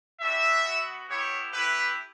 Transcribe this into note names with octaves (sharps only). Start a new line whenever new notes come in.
G3 D4 F#4 E5
B3 F#4
B3 E4 G4 C#5
A3 E4 G4 B4